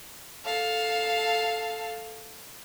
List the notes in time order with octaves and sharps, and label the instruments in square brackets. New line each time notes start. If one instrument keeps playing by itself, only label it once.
[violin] A4 F5